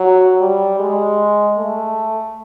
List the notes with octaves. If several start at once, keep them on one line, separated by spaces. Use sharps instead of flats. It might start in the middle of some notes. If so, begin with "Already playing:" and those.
Already playing: F#3
G3
G#3
A3